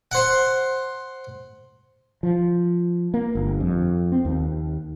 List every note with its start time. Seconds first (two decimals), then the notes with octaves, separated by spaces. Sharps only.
0.12 C5 F#5
2.23 F3
3.14 A#3
3.35 G1
3.60 F2
4.12 C4
4.25 D#2